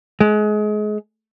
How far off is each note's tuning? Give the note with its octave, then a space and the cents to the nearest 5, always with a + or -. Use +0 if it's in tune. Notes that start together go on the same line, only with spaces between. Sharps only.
G#3 +30